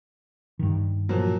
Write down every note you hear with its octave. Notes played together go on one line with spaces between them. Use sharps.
G2 D#3
A#2 F3 F#3